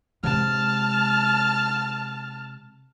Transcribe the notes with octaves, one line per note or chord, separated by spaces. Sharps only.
C3 G#3 A5 F6